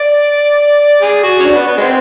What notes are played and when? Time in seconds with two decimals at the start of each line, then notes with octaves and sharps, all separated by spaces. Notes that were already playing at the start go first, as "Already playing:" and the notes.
Already playing: D5
1.02 G#4
1.23 F#4
1.40 C#4
1.45 D4
1.55 B3
1.67 B3
1.77 G#3 C4